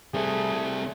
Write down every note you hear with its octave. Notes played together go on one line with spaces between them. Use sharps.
G3 A3 C4 G#4